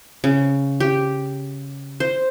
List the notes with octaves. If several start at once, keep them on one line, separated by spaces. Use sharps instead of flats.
C#3
G4
C5